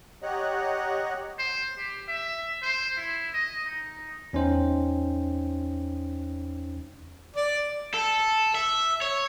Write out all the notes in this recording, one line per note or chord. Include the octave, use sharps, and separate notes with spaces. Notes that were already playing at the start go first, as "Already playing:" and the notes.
G4 C#5 D#5 F#5 A#5 F#6
C5
G4
E5
C5
E4
D#5
D#4
E2 C#4 D#4 C5 G5
D5
A4
E5
C#5